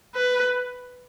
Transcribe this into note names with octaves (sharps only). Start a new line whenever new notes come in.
B4